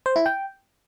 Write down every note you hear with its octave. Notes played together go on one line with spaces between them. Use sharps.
C5
E4
G5